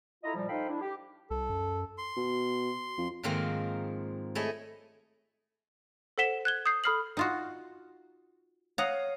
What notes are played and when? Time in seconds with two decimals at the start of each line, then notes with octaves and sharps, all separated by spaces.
0.24 E4 F4 A4 D#5 A#5
0.35 A#2 F3 G3
0.49 D#4 A4 C5 F5 G5 B5
0.69 D4 E4
0.81 G4
1.30 C2 A4
1.50 F#2
1.98 C6
2.17 B2
2.98 F2
3.23 G#2 D#3 F3 A#3 C4
4.35 A3 E4 G#4 C#5 D#5
6.18 A4 C5 F#5 B6 E7 G7
6.45 F#6 G#6 G7
6.66 D#6 G6 C7
6.84 A4 B5 D#6 F6 C7 F#7
7.17 D#4 F4 F#4
8.78 C#5 F5 F#5 A#5 D#6